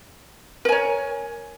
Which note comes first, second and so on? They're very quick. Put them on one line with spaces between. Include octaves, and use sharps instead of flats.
A#4 G#5 C#5